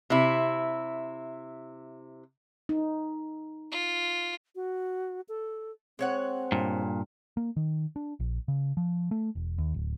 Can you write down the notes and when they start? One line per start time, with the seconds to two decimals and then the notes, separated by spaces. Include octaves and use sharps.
0.10 C3 E4
2.69 D#4
3.72 F4
4.56 F#4
5.29 A4
5.99 G#3 C4 C#5 F#5
6.52 G2 A#2
7.37 A#3
7.57 D#3
7.96 D4
8.20 A#1
8.48 C#3
8.77 F3
9.11 A3
9.35 E1
9.58 D#2
9.74 D1